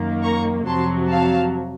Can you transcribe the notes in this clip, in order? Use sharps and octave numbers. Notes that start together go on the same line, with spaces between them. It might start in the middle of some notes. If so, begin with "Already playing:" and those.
Already playing: F#2 D#3 A#3
A#5 C#6
F2 C3 F#3 A5 C6
F5 A5